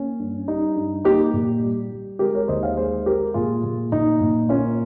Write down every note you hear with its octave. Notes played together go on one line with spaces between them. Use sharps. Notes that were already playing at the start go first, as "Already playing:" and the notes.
Already playing: A#3 C#4
G2
G3 D#4
G2
A#3 D#4 G4
A#2
G3
G3
G#3 G4 A#4
A#4 C#5
D#2 C5 D#5
C#5 F5
G#3 G#4 C5
G#3 G4 A#4
A#2 F4 G#4
A#2
A#2 D#4
A#2
A#3 C#4 F4